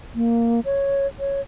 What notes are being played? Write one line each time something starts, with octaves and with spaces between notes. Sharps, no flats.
A#3
C#5
C#5